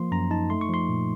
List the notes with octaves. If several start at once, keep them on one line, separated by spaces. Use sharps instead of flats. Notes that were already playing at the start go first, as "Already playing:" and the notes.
Already playing: F3 A#3 C6
F#2 A#5
D#4 A5
A3 C6
C#6
F3 C6
A#2